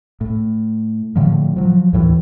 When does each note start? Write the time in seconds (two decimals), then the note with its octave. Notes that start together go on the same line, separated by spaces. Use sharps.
0.21 A2
1.16 A2 D3 F3
1.56 F3 F#3
1.93 D#2 A2 E3